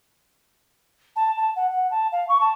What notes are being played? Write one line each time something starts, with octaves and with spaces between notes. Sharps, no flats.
A5
A5
F#5
F#5
A5
F5
C#6
A5